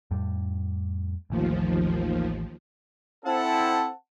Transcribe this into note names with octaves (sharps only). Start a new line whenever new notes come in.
F2 A2 G3
A1 D#2 E3 F3 A3
C4 E4 A4 F#5 A5